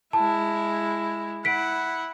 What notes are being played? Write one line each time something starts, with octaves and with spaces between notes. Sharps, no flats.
G#3 E4 A5
E4 F#5 B6 D7